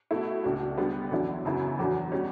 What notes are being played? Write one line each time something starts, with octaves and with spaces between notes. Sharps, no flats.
B2 A3 E4
C#2 B2 A3 D4 F#4
D3 G3 B3
E2 D3 F#3 C#4 E4
F#2 C#3 F#3 B3 E4
E2 D3 F#3
B2 G3 C#4